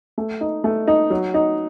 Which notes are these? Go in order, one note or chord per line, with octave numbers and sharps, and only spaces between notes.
A3
D#4
A3
D#4
F#3
D#4